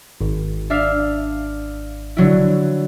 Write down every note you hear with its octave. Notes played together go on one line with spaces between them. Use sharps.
G#1
D4 E5 F5
D3 F#3 E4